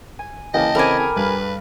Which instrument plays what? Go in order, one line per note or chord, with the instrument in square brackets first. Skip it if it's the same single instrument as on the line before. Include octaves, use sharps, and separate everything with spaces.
[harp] G#5
[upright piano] C#3 E3 A#3 [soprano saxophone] D#5 [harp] G5 A5
[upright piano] C#3 E3 C4 [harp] A4 B5 D6 [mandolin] A#4 G#5
[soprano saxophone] G#4
[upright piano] G2 F6 [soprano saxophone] B4